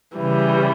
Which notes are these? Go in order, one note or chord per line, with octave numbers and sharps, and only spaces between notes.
C#3 E3 G3